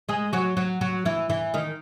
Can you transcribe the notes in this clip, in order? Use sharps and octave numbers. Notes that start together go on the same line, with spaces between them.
G#3 G#4
F#3 F#4
F#3 F#4
F#3 F#4
E3 E4
E3 E4
D#3 D#4